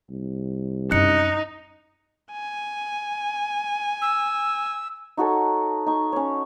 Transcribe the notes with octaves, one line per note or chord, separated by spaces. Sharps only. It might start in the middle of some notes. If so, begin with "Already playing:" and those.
C2
F#2 C4 D#4 F#6 C#7
G#5
E6
D#4 F#4 A4 C#5
D#4 C#6
C#4 C#5